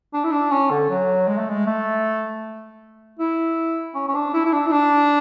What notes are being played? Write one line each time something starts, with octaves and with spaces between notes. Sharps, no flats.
D4
E4
D4
C#4
D3
F#3
G#3
A3
G#3
A3
E4
C#4
C#4
D4
E4
E4
D4
E4
D4